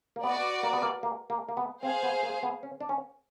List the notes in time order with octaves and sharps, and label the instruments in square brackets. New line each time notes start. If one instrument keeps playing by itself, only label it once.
[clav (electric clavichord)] A#3
[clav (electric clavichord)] B3 [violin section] F#4 B4 D5
[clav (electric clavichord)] A#3
B3
A#3
A#3
A#3
A#3
B3
[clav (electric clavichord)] C4 [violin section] G#4 C5 F5
[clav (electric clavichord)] B3
A#3
B3
C#4
D4
C#4